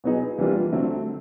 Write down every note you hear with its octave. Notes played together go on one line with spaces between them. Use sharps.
B2 F#3 B3 D#4 G#4
E3 G3 A#3 D4 F4
D3 F#3 A3 C4